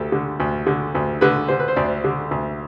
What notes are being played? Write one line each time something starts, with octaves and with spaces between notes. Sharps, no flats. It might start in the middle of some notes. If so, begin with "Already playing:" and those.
Already playing: D2 G4 A4
D3
D2
D3
D2
D3 B4
D3 C5
B4
C5
D2 D5
D3
D2